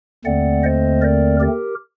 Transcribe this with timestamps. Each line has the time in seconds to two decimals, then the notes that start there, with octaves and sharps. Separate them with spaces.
0.25 D#2 D3 A3 C4 D5 F#5
0.63 C5 D#5
1.01 A#4 D5
1.40 G4 A#4